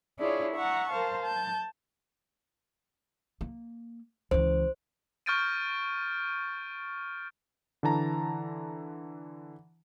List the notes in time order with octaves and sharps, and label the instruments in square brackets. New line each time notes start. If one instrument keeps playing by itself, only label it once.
[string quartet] D4 E4 F4 G#4 C#5 D5
E5 F#5 A#5 C#6
A#4 C5 F5 A5
A5 G6
[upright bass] A#3
[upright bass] C#2 E3 [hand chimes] C5
[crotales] C#6 F6 G6 A6 D7 D#7
[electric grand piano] D3 E3 A5 A#5